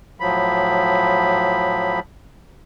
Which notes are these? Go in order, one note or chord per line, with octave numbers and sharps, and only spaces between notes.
A2 F3 F#3 B5